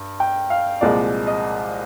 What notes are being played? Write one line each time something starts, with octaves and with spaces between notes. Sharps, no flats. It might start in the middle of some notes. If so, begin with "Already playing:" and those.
Already playing: G2
G5
F5
C2 A#2 F3 G#3 D5
D#5